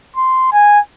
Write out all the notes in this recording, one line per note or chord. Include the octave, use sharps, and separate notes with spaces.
C6
G#5